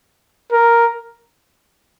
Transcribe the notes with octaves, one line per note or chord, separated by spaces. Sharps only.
A#4